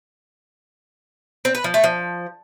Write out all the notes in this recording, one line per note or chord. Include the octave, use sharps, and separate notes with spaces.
C4
B4
F3
A3
F3